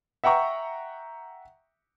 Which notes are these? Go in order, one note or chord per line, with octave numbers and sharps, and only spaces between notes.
E5 F#5 G5 A#5 C#6